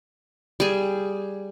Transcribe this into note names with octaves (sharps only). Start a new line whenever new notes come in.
G3 G#4